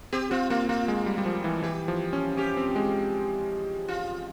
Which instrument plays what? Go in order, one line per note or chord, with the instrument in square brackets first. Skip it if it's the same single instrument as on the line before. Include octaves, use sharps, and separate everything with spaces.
[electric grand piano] C4 [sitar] G4
[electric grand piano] C4 [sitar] F4
[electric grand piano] A#3 [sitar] F4
[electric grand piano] A#3 [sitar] F4
[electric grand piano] G#3
G3
G3
F3
E3
[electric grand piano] E3 [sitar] G4
[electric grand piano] F3
C#4
[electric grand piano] C#4 [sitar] G4
[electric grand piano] C4
G#3
[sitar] F4